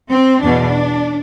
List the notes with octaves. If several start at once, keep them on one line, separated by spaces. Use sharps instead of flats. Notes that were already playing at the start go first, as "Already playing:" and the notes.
C4
E2 B2 D4